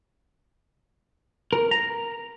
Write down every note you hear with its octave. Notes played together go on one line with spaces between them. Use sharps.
A#4
A#5